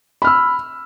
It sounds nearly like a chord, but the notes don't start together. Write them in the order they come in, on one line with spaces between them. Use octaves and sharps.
B5 F6 E6